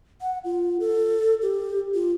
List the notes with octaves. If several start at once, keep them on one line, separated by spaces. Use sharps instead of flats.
F#5
F4
A4
G4
F4